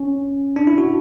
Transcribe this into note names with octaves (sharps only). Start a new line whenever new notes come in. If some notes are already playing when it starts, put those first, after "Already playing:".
Already playing: C#4
D4
E4
F#4